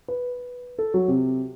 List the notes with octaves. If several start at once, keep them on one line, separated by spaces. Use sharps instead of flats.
B4
A4
F#3
C3